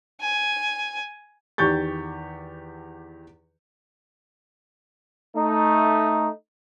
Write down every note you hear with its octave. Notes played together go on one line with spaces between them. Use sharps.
G#5
E2 D#3 G4 C#6 G6 A6
A3 D#4